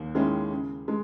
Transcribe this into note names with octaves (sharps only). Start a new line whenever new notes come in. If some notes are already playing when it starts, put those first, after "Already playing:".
Already playing: D#2 D#3
D#3 G#3 C#4 E4
C#3
G#3